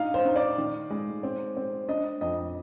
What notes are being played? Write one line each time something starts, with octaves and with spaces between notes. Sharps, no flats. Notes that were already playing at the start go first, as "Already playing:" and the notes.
Already playing: D4 D#4 F5
C5
D#4
D5
D#3
G#3
C4
C4
D4 D#5
F2 D#5